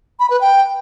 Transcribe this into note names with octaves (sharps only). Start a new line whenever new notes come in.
B5
B4
G5